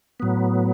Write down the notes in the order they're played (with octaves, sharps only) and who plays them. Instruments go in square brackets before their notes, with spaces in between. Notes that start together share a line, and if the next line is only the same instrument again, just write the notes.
[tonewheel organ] A2 F#3 B3